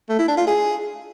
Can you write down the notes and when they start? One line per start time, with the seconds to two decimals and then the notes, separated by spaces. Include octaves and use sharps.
0.09 A3
0.19 E4
0.28 D4
0.37 F4
0.47 G#4